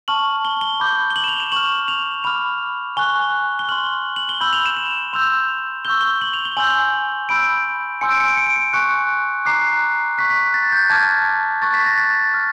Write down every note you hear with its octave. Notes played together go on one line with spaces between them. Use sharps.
A5 C#6 F6 F#7
G7
G7
B5 D6 G6
G7
F#7
E7
F7
E7
C#6 F6 F#7
F7
B5 D6 F6 F7
G#5 C#6 F#6 G7
G7
C6 F6 F#7
F#7
G7
B5 E6 G6 F#7
F7
E7
E7
C6 E6 G6 F7
C#6 E6 G6 G7
G7
F#7
F7
G7
G#5 C6 E6 G6 F#7
B5 E6 G6 D7
G#5 C6 E6 G6 C#7
D7
C#7
D7
C#7
D7
C#7
G#5 C#6 F#6 C#7
A#5 D6 F#6 C7
C#6 F#6 B6
B6
A6
G6
A5 D6 F6 G#6
C#6 F#6 A6
B6
A#6
A6
F6